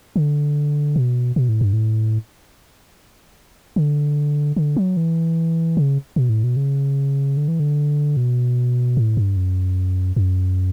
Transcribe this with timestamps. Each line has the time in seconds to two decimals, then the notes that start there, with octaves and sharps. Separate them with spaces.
0.16 D3
0.96 B2
1.36 B2
1.49 A2
1.61 G2
1.73 A2
3.76 D3
4.56 D3
4.77 F#3
4.97 E3
5.77 C#3
6.16 B2
6.29 A2
6.44 B2
6.56 C#3
7.37 D3
7.48 E3
7.60 D3
8.17 B2
8.97 A2
9.17 G2
9.36 F#2
10.16 F#2